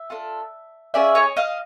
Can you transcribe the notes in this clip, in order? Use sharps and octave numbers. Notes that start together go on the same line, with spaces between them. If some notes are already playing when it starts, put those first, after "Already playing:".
Already playing: E5
D4 F4 A4
C#4 F4 G#4 D5 E5
C#5 D#5
D#5 F5